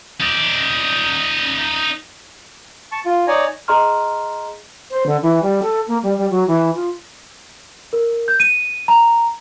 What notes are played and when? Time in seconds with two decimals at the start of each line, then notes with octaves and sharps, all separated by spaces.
0.20 D#4 D5
2.92 A5 C#6
3.05 F4
3.27 D#4 C#5 D5 G#5 A#5
3.68 G#4 D#5 A#5 C6 F6
4.91 C5
5.06 D3
5.23 E3
5.42 G3
5.62 A4
5.88 A#3
6.03 G3
6.18 G3
6.31 F#3
6.47 E3
6.75 F4
7.93 A#4
8.28 G6
8.40 D#7
8.88 A#5